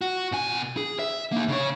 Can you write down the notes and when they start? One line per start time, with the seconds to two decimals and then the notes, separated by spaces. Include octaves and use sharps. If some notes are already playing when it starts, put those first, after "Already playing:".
0.01 F#4
0.32 B2 G#5
0.77 G#4
0.99 E5
1.32 A#3 D#4
1.48 C#3 C#5